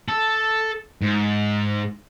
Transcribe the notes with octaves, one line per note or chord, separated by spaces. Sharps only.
A4
G#2